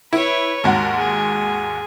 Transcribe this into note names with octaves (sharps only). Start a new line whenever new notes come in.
E4 B4 C#5
D#2 G#2 F#4 A#4
G#4